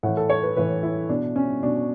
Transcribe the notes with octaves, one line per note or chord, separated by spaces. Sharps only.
A2 E3 F#5
A4
C#5
B4
A2 E3 B4
E4
B2 D4
C#4
B2 D4